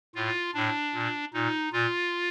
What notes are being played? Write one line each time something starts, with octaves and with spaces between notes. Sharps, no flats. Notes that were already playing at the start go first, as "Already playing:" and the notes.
A2 F4
A2 D4
A#2
A#2 D#4
A#2 F4